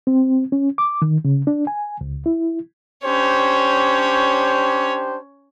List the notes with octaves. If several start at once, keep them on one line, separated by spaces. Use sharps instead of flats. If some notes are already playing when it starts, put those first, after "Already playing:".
C4
C#4
D6
D#3
C#3
D4
G#5
C#2
E4
C#4 D4 G4 C5 C#5